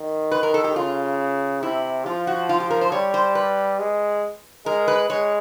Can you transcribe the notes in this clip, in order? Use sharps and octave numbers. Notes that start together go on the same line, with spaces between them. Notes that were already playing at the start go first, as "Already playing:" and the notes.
Already playing: D#3
B4
A#4
A4
G4
C#3 F4
C3 E4
F3 F4
F#4
F4
G4
A#4
C5
G3 C#5
C5
B4
G#3
G#3 A#4
B4
G#3 C#5